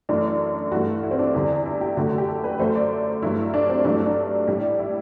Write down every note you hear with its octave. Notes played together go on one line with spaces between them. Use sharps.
F#2 E3 A3 D4
G2 E3 A3 F#4
E4
C4
D4
E2 D3 G3
E4
G4
F#2 D3 A3 F#4
F#4
G4
A4
B4
F#2 F#3 A3 C5
D5
G2 F#3 A3 E4
D4
C4
G2 F#3 A3 D4
D4
D4
A2 G3
E4